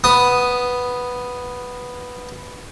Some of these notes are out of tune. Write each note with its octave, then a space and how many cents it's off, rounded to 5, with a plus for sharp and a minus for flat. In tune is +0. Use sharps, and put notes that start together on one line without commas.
B3 +0 D#6 +0